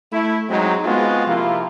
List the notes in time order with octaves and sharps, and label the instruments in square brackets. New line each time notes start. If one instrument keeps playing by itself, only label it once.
[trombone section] A3 E4
F#3 G#3 C4 D#4
G#3 B3 C4 F4 F#4
C3 F3 A#3 E4 F4